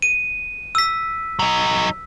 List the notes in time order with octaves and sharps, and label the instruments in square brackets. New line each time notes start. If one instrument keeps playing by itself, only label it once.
[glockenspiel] D#7
E6 B6
[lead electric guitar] F#3 D#4